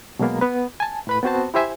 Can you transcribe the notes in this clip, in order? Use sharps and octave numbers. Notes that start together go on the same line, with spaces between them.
B2 F#3 G#3 A#3 B3
B3 B4
G#5 A5
A2 B4 B5
B3 C4 F#4 C5 A5
E4 G4 C5 E5 G#5